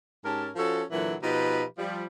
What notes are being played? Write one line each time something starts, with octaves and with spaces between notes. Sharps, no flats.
G#2 C#4 G4 A#4 A5
F3 C#4 F#4 A4
A#2 D3 E3 F#3
B2 F3 D#4 G4 B4
F3 G3